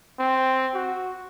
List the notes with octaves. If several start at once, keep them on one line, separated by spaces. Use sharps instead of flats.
C4
F#4